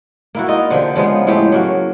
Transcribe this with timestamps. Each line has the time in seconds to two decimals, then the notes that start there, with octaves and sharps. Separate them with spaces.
0.35 A#3 E4 F#4
0.48 D#4 F4 D#5
0.70 D3 F3 G4
0.96 C#3 F3 G#3 B3
1.27 A2 G#3 A3 G4
1.52 F#3 A#3 F#4